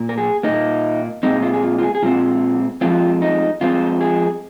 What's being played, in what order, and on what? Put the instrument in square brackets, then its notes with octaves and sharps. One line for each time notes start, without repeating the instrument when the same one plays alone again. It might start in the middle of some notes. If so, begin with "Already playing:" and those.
Already playing: [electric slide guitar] A#2 A#3
A#4
G#4
A#2 A#3 D#4
A#2 G#3 C4 D#4
F4
G#4
F4
F4
G#4
G#4
A#2 G#3 C4 F4
F2 F3 G#3 C4 F4
D#4
F2 F3 G#3 C4 F4
G#4